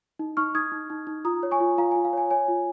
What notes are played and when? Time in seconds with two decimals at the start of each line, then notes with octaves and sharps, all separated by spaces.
0.19 D#4
0.37 D#4 C#6 F6
0.55 D#4 D#6 G#6
0.72 D#4
0.90 D#4
1.07 D#4
1.25 F4 A#5 D#6
1.43 C#5
1.51 G#5 C#6
1.60 F4
1.78 F4 F5 A#5
1.91 F4 G#5
2.05 F5
2.13 C#5 G#5
2.31 C#5 G#5
2.48 F4